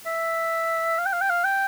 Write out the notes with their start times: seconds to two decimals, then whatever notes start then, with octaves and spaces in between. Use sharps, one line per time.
0.06 E5
0.99 F5
1.06 G5
1.13 F5
1.21 G5
1.30 F5
1.45 G5